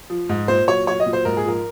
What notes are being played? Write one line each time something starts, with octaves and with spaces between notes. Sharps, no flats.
F3
G#2
A#2 C5
F#3 C#5
F#3 C#5
D#5
A#2
C5
G#2 A#4
G#4
F3 A#4